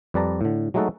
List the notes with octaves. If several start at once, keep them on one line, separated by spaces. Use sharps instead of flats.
F2 G3 B4 D5 A5 A#5
A2 D3
F#3 G#3 A3 D#4 F#4 A4